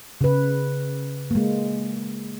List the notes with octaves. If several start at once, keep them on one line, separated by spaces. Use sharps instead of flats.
C#3 B4
G#3 A#3